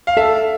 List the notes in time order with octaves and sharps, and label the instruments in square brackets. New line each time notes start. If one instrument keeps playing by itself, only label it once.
[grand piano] F5
[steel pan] A4 [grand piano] E5